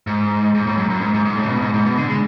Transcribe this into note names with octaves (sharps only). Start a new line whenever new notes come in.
G#2
G#2
A2
F#2
F#2
G#2
G#2
G#2
A2
C#3
B2
G#2
G#2
B2
D3
G#3